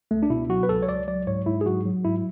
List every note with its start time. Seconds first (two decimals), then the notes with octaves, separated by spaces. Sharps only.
0.11 C#2 A3
0.23 D4
0.30 B2 E4
0.49 F#3 F#4
0.63 B4
0.69 C#2 A4
0.83 C#5
0.88 C#2 D5
1.07 F#3 D5
1.27 G#2 C#5
1.46 G#2 E4
1.61 G#4
1.66 F#3 F#4
1.85 F#3
2.04 G#2 E4